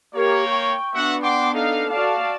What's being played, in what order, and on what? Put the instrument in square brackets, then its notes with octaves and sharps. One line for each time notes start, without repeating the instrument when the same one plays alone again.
[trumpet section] A#3 C#5 [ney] G4 [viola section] A#4
[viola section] G5 [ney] C#6
[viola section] B3 D4 [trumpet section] F#4 E5 F#5
[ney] F#5 [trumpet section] G5 C6 D6
[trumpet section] D#4 F5 [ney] A4
[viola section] F#4 D5 A5 [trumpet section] F5